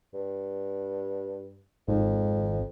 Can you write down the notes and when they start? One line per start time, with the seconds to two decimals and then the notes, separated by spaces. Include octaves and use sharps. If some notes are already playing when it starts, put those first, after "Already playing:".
0.14 G2
1.88 G#1 F2